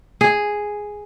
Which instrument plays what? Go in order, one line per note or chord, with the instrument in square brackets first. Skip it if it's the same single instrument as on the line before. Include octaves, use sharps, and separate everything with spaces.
[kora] G#4